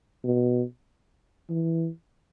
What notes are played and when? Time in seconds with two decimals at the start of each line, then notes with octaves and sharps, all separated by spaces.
0.24 B2
1.50 E3